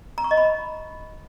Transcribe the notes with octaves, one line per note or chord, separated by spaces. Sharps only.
A#5
C#6
D#5
B5